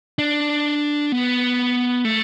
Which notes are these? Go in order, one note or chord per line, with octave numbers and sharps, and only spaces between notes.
D4
B3
A3